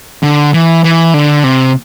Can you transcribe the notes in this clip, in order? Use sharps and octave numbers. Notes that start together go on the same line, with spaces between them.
D3
E3
E3
D3
C3